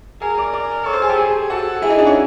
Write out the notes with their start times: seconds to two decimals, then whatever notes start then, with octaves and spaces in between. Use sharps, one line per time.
0.21 G#4 A#4 G#5
0.38 D5 D6
0.53 D5 D6
0.85 A4 C#5 C#6
0.93 C5 C6
1.02 G#4 G#5
1.09 G4 G5
1.18 G#4
1.50 F#4 A4 F#5
1.82 E4 G#4 E5
1.90 D#4 D#5
1.98 D4 D5
2.07 C#4 C#5